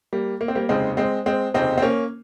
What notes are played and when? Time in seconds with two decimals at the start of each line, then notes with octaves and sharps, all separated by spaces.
0.13 G3 A#3
0.41 A#3
0.48 C4
0.55 G3 A#3
0.69 F1 D#2 C#3 G#3 C4
0.97 G#3 C4
1.26 G#3 C4
1.54 F1 D#2 C#3 C4 D#4
1.78 C4
1.82 A#3 C#4